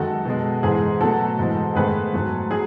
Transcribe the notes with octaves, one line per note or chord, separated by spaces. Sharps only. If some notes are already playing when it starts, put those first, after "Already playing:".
Already playing: F#2 D#3 G#3 F#4 A4
B2 G#3
G#2 E3 G#3 G#4
B2 F#3 A3 F#4 A4
G#2 E3 G#3
G#2 D#3 A3 G#4 B4
G#2 F#3 A3
F#3 G#4